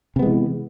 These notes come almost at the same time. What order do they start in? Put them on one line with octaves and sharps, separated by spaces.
C3 B3 G#3 E3